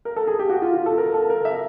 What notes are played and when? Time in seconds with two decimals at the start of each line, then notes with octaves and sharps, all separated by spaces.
0.05 A#4
0.16 A4
0.27 G#4
0.39 G4
0.49 F#4
0.62 F4
0.74 F4
0.86 A4
0.98 A#4
1.14 A4
1.30 A#4
1.45 E5